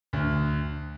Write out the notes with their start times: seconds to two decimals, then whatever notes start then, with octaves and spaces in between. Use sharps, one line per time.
0.13 D2